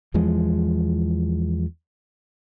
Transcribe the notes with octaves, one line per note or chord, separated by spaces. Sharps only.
E2 E3 F3 G#3